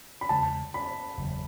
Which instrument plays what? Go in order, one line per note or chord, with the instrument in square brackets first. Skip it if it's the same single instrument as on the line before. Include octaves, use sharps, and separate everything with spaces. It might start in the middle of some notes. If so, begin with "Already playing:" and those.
[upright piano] B5
[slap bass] E2 C#3 G#3 [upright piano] A5
[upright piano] B5
[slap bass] F#1 E2 C#3 F#3